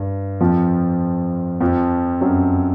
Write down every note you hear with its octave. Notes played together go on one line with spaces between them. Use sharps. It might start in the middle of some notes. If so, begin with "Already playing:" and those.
Already playing: G2
F2 F3
F2 F3
F#2 F#3